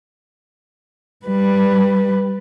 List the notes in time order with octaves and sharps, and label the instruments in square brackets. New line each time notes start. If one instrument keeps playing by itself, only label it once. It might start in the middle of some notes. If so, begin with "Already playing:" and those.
[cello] G3 B4